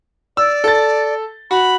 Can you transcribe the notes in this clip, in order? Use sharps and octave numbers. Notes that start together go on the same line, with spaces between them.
D5 E6
A4 A6
F#4 B5